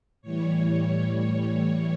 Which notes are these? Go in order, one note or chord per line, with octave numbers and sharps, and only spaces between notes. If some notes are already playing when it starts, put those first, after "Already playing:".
A2 E3 G3 C#5